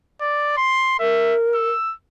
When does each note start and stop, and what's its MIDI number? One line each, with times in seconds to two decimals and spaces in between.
0.21 0.56 74
0.57 0.96 84
1.00 1.70 70
1.00 1.35 76
1.55 1.94 88